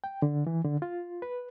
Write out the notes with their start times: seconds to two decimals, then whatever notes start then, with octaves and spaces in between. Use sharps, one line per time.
0.04 G5
0.22 D3
0.47 E3
0.65 D3
0.82 F4
1.22 B4